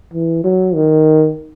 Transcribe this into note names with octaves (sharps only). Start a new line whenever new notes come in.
E3
F#3
D#3